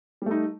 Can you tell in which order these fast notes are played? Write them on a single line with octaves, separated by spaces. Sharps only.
G3 A3 D#4